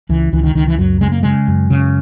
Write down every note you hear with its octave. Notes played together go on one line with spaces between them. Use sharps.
C#2 E3
C#2 E3
D#3
C#2 D#3
E3
F#2 F#3
C#3 G#3
A#3
C#3 G#3
F#2
C#3